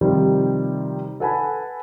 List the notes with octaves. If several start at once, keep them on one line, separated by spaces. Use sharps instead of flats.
C3 D#3 F3 G3
A4 B4 F#5 G#5 A5 B5